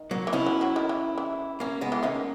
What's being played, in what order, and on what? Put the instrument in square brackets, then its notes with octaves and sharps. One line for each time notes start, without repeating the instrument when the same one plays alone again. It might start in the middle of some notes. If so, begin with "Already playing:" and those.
Already playing: [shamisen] D#3
[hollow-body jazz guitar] F#3 A#3
[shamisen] E3
[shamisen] D#3 [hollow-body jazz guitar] C#4 E4
[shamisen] F#3
F#3
D#3
E3
E3
[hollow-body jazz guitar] A#3 C#4
G#3 B3
[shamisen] E3
[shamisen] D#3 [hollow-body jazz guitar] A#3 C#4